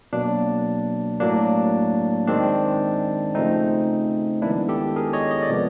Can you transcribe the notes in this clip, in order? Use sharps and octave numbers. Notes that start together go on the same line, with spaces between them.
B2 F#3 A#3 D4
A2 F#3 A#3 D4
D#3 G#3 C4 D4
C#3 F3 A3 C4 D#4
D#3 G#3 B3 D4 E4
G4 A4
G#4 A#4
C#5 D#5
D#5
D5
C3 F3 G#3 B3